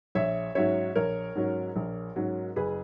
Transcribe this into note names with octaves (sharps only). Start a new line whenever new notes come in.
A#1 C#5 E5
G#2 F#3 C#4 C#5 E5
A#1 A#4 C#5
G#2 F#3 C#4
A#1
G#2 F#3 C#4
F#1 G#4 B4